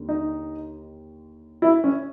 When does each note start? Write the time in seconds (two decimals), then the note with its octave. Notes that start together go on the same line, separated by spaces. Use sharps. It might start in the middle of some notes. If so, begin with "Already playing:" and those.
Already playing: D#2 D3
0.09 D#4
1.62 E4
1.84 C#4